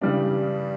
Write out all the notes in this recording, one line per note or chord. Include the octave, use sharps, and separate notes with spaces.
G2 C#3 E3 G3 D4